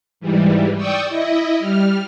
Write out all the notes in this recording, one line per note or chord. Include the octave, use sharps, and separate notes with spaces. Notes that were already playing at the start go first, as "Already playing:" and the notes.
G#2 E3 G3
D5 G5 C#6 D#6 E6
E4 D#5 E5
G3 F6